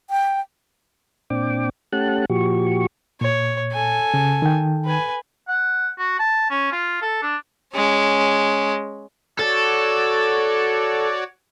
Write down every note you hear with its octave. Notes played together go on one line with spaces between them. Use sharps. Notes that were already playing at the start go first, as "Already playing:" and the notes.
G5
A#2 C4 D4 G5 D6
A3 C#4 G4 F#5 A5 F#6
A#2 F3 F#4 G4 C#6
A#2 C#5
A4 G#5
C#3
D#3 G5
B4 G#5
F#5
F#4
A5
C#4
F4
A4
D4
G#3 C#4
F#4 A4 C#5 D5